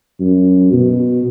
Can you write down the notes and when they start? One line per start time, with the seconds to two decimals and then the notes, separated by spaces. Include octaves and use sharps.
0.20 F#2
0.73 B2